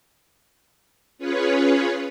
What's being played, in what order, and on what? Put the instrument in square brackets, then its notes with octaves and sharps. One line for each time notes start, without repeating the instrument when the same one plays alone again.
[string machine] C#4 F4 G#4 B4 C#5